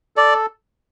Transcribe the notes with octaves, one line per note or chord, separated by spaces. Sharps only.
A4 D5